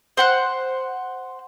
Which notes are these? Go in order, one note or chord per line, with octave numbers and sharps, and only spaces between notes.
C5 F#5 F#6